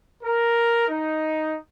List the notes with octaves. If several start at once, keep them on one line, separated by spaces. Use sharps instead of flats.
A#4
D#4